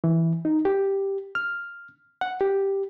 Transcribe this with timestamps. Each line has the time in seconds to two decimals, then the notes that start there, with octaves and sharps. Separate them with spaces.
0.04 E3
0.45 D#4
0.65 G4
1.35 F6
2.21 F#5
2.41 G4